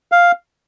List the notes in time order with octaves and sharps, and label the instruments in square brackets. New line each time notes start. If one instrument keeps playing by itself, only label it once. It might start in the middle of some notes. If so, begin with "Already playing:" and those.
[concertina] F5